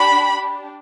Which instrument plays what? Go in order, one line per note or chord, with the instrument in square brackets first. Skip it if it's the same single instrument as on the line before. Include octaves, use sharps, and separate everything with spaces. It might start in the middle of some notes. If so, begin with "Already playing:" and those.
Already playing: [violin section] D4 G4 B5